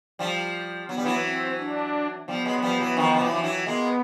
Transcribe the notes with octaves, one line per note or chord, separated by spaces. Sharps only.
F3 G3
F#3 B3
G3
E3 F#3
C4
D4
F3 G3 B3
F#3 G#3
F#3
F3 G3
E3 F#3
D#3 F3
F3
E3 F#3
F3
E3 F#3
G#3 A#3 B3